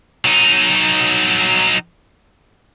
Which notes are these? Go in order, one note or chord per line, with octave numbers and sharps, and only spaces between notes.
F#3 D#4